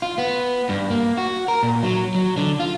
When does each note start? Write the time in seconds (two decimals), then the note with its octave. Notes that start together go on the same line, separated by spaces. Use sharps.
0.02 F4
0.18 B3
0.69 G2
0.90 A#3
1.17 F#4
1.48 A#4
1.63 A#2
1.83 F#3
2.15 F#3
2.37 D3
2.60 F4